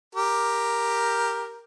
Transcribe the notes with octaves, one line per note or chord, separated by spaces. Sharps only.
G4 A#4